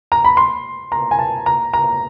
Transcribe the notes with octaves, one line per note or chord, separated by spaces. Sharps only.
A#5
B5
C6
A#5
G#5
A5
A#5
A#5